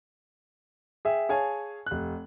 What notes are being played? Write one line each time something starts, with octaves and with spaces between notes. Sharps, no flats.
G#4 E5 G5
G#4 C#5 F5 G#5 A5
F1 F#6